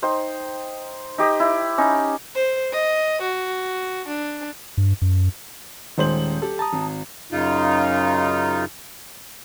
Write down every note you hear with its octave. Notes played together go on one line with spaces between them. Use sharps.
D#4 C5 G5
D#4 G4 D#5
E4
C#4 D#4
C5
D#5
F#4
D4
G2
F#2
D#1 D#3 G#3 C5 F#7
G4 A4
A5 A#5 D#6
G#1
F#2 C#3 D#4 F4